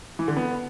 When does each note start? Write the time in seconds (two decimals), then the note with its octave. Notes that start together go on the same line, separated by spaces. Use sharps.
0.19 E3
0.28 D3
0.37 B3